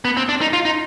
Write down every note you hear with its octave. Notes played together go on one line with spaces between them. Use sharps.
B3
C4
D4
D#4
F4
D#4